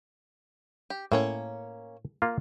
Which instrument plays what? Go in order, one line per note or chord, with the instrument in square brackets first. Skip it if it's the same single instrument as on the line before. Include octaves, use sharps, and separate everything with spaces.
[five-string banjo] G4
[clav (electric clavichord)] A2 [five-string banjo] A#3 C#4 C#5
[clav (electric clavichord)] A#3 F4